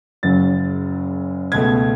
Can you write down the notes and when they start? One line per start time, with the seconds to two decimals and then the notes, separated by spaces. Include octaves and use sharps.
0.23 F#1 F#2 C#3 F#3 A6
1.52 C#2 B2 A3 G#6